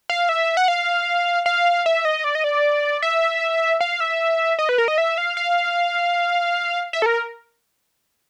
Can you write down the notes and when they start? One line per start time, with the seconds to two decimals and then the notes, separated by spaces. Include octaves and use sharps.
0.10 F5
0.29 E5
0.57 F#5
0.68 F5
1.46 F5
1.86 E5
2.05 D#5
2.24 D5
2.35 D#5
2.44 D5
3.02 E5
3.81 F5
4.00 E5
4.59 D#5
4.69 B4
4.78 A#4
4.88 D#5
4.98 E5
5.18 F5
5.37 F5
6.93 E5
7.02 A4
7.06 A#4